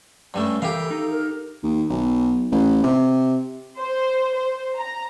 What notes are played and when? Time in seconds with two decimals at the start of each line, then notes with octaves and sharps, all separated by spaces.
0.34 G2 G3 A3 C#4
0.62 E3 G4 A4 A#4 E5 F5
0.91 D#4
1.10 A#4
1.63 D#2
1.89 B1
2.52 A1
2.83 C3
3.79 C5
4.36 C5
4.77 A#5